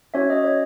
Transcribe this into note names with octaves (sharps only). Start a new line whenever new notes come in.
C#4 F#4 C#5 E5
D#5
C#5